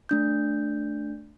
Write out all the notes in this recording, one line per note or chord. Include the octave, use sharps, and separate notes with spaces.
A3 D4 G6